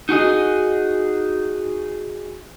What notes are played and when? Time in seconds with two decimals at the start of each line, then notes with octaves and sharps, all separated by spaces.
0.09 D#4 F#4 G#4 D#5